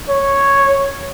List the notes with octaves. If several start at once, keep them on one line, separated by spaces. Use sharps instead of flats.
C#5